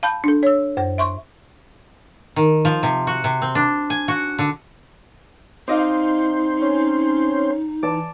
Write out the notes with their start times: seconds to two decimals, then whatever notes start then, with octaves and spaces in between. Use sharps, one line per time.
0.03 F5 A5 B5 G6
0.24 D4 A4
0.43 C#5 E6
0.77 F#2 C5
0.98 E5 C6 C#6
2.36 D#3
2.65 F3
2.83 C3
3.07 F#4
3.24 C3
3.42 C4
3.55 D4
3.90 G#5
4.08 F#4
4.39 D3
5.68 C4 D#4 C5 D5 D#5 F5
6.61 C#4
7.83 E3 D5 A5